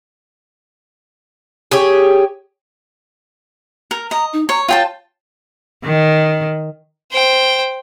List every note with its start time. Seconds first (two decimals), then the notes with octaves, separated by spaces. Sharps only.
1.71 G4 G#4 C#5
3.91 A#4
4.11 D#5 A#5
4.33 D#4
4.49 C#5 A#5
4.68 F4 C#5 G5 A5
5.84 D#3
7.11 C5 G5